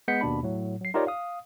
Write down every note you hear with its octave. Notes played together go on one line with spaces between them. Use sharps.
G#3 B3 G6 B6 C#7
D#2 B2 D4 B5
A2 F#3
F#3 C7
D#4 F4 G4 A#4 C#5 D5
F5 D#6